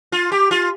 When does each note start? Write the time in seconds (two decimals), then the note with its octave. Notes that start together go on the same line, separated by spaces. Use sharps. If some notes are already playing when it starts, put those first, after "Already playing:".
0.12 F4
0.32 G4
0.51 F4